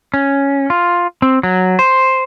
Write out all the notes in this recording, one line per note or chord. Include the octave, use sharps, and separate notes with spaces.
C#4
F4
C4
F#3
C5